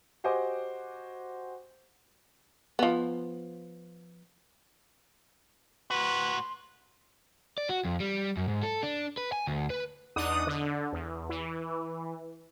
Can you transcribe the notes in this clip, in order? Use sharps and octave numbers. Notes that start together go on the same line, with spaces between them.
F#4 G4 C5 D#5 G#5 D6
F3 B3
A2 F#4 B4 C6
D5
F#4
F2
G3
F#2
G#2
A4
D4
B4
G#5
D2
B4
E2 D4 D#4 F#5 D#6
D3
E2
E3